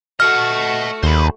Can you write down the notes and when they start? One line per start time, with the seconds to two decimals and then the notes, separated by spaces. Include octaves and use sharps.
0.20 A3 F#4 D#5 F#5 F6
1.03 D#2 C5 B5